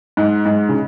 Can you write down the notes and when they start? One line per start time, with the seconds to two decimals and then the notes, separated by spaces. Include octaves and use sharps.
0.17 G#2
0.45 G#2
0.69 C#3